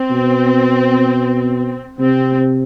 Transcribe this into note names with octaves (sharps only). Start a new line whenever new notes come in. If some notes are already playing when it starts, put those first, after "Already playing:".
Already playing: C4
B2
C3 C4